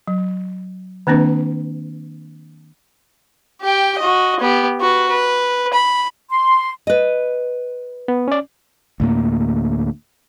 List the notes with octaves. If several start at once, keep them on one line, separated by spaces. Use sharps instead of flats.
F#3
D#3 A#3 C4 D4 B4
G4 G5
F#4 D#5
B3 G4
F#4 B4
B4
B5
C6
B4 D#5
B3
C#4 D5
D2 A2 A#3